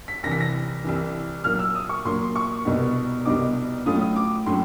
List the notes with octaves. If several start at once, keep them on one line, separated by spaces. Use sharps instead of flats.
B6
C2 C3 E3 A#6
B6
A#6
C2 C3 E3
A#2 F#3 A#3 F6
E6
D#6
C#6
A#2 F#3 A#3 C6
C#6
C2 B2 G3 B3 D#4
C2 B2 G3 B3 D#4 D6
A2 F#3 A3 C#4 F4 D#6
D#6
D6
A2 F#3 A3 C#4 C6